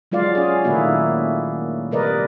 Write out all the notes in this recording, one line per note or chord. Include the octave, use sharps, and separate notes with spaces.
F#3 G#3 F4 D5 F5
C#4 G#4
A#2 D#3 A3 A#3 E4 F#4
C3 G3 A#4 B4 D5 D#5